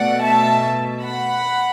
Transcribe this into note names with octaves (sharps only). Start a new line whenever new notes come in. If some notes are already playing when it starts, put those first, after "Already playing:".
Already playing: B2 A3 D5 F#5
E5 A5
F#5 B5